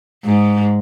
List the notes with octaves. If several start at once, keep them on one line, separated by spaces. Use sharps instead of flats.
G#2